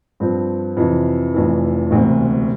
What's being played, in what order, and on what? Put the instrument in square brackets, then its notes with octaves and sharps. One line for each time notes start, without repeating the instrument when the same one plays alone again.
[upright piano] G2 F3 C4 F4
F2 C3 E3
F1 F2 E3
E1 D2 C3